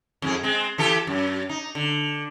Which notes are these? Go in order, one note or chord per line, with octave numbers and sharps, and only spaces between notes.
F2 G#2 G#4
G#3 C4
E3 G4 A4
F#2
D#4
D3